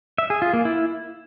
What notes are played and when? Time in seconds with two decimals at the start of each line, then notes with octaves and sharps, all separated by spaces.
0.18 E5
0.30 G#4
0.42 F4
0.53 A#3
0.65 E4